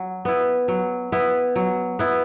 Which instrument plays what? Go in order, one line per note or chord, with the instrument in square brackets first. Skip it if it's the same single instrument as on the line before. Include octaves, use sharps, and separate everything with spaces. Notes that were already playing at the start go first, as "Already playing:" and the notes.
Already playing: [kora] F#3
B3 E4
F#3
B3 E4
F#3
B3 E4